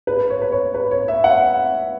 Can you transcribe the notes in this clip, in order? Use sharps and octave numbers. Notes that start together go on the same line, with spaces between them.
B4
C#5
B4
C#5
B4
C#5
E5
F#5